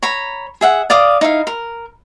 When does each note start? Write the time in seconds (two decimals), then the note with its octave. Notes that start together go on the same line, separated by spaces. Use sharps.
0.03 C#5 A#5 B5
0.61 G#4 E5 F#5
0.90 D5 F5 D6 D#6
1.21 D#4 E4 F5
1.47 A#4